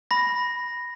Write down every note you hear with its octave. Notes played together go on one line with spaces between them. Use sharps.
B5 A#6